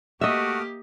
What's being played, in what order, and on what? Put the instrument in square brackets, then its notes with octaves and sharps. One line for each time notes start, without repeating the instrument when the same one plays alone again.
[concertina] A3 D#6 F6 [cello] A#3 G4 [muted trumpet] F#4 [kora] D#5 E5